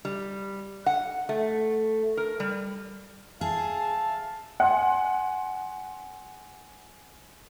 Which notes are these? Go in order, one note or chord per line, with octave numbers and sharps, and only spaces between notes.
G3
F#5
A3
A#4
G3
G#4 E5 F5 A5
F#5 G#5 C6